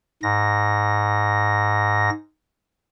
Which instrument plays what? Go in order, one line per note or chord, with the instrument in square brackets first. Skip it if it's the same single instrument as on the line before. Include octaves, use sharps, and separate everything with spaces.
[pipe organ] G#2 A#6